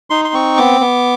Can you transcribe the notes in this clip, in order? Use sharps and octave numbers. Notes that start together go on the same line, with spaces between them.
D#4 C6
C6
C4 C#6
B3 D6
B3